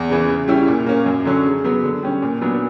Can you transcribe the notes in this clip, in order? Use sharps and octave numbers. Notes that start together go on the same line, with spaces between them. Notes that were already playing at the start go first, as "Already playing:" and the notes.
Already playing: E2
C#3 E3
C#3
G3 C#4 E4
A#2
A#3 C#4
F#2
D3 F#3 C#4
C#3
F#3 B3
D3
G3 C#4
A#2
F#3 B3 D4